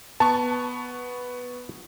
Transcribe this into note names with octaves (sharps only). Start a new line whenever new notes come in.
B3 A5 C#6